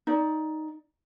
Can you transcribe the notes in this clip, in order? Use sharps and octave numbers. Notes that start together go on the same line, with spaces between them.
D#4 D5